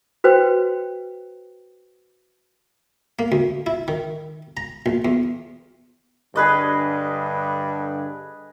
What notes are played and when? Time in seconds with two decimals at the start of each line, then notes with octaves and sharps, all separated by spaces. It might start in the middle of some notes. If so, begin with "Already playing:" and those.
0.24 F#4 B4 C5 G5
3.19 A#3
3.32 D2
3.66 E4
3.88 D#3
4.57 A#5
4.86 A#1
5.05 E2
6.36 G2 D3 G#4 B4 D#5